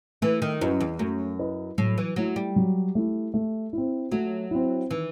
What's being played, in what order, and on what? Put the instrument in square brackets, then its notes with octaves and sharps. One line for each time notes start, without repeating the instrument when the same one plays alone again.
[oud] E3 [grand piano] A3
[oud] D#3
[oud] F#2 [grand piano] E4 B4 D#5
[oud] E2
[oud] F#2 [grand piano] A3
[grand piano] E4 B4 D#5
[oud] A2 [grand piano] F#3
[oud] E3
[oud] F#3 [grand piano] A3 E4
[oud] G3
[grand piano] F#3
A3 E4
A3
C4 E4
[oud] F#3 [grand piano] A3
[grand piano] C4 E4
[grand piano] D#3 [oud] E3